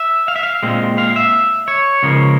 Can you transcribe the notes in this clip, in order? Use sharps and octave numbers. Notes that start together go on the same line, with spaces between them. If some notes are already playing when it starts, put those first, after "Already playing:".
Already playing: E5
F5
E5
F5
A#2 G#3 C4
F5
E5
C#5
C#2 C#3 F3 A#3